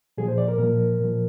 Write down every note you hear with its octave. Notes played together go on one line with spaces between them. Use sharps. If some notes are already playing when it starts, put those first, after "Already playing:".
A#2 F3 G#4
C5
D5
A#4
A#2 F3 A#4
A#2 F3